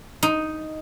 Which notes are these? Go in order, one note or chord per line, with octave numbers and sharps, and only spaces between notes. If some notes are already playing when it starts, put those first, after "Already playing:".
D#4